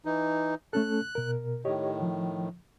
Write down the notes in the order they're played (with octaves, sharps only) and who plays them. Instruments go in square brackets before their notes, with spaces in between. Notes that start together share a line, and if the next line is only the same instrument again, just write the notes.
[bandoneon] E3 D#4
[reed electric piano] A3 C#4 A4 [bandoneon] F#6
[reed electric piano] B2 A#4
[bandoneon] A2 D#3 [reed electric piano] G4 C#5 D#5
[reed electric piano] F3